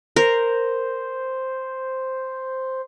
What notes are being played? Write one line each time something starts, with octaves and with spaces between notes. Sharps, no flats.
A#4 C5